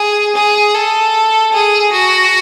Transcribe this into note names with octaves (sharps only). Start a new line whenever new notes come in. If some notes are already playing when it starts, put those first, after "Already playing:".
Already playing: G#4
G#4
A4
G#4
F#4